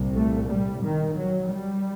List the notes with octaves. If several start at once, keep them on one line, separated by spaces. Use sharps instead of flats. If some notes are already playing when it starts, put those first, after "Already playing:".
Already playing: C2 A#2
A3
G3
D#3
F#3
G3